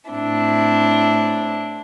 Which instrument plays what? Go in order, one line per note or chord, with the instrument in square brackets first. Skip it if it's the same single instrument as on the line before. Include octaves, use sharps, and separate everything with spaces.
[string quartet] A2 C4 D4 E4